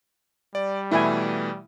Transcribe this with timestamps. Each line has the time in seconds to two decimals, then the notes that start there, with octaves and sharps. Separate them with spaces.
0.55 G3 D5
0.91 B2 E3 A3 E4 G#5